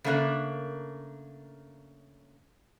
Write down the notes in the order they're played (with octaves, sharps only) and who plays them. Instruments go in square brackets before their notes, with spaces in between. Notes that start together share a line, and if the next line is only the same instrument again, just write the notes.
[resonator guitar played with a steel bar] C#3 A3 A#3 D4 A#4